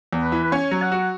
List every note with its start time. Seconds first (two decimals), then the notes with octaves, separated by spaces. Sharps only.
0.13 E2
0.22 B4
0.32 E3
0.44 B4
0.52 C#4 C#5
0.71 F#3
0.82 F#5
0.92 F#4